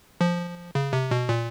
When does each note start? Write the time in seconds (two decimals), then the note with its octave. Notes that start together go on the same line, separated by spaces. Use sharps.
0.21 F3
0.75 C#3
0.93 C3
1.11 B2
1.29 A#2